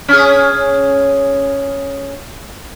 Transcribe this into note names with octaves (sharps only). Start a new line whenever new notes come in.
C#4 G#4